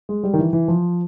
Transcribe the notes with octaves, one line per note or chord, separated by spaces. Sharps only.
G#3
G3
D#3
E3
E3
F3